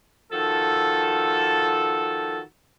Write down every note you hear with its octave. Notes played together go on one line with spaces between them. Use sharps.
D#3 F3 F#4 A4